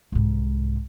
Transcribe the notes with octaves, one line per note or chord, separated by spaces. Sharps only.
C2 G#2